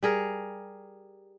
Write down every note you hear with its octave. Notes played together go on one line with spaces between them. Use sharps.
G3 G#4 A#4